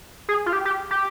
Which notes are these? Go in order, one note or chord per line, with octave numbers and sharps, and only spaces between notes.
G#4
F4
G4
G4
G4